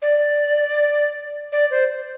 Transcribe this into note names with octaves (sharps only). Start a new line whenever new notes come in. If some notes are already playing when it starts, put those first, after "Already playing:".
D5
D5
C5